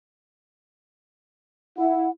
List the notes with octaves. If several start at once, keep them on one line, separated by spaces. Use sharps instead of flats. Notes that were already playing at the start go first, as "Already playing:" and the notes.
E4 F#5